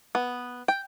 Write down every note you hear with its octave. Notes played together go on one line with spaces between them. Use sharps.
B3
G5